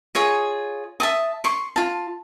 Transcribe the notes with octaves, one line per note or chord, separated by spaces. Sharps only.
F4 G#4 C#5 D#5
E5 A5 D#6
C6 C#6
F4 A5